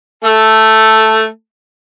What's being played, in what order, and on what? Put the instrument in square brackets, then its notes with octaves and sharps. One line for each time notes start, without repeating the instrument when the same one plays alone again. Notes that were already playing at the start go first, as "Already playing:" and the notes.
[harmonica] A3 A4